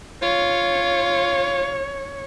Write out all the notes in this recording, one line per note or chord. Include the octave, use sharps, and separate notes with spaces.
F4 C#5